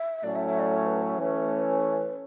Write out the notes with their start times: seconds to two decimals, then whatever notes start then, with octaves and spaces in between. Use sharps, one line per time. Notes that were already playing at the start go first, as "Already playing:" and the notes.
Already playing: E5
0.24 A2 F#3 A3 C#4 D5
0.35 E5
0.48 E5
0.59 D5
0.71 C#5
0.86 B4
1.02 C#5
1.17 E3 A3 C#4 B4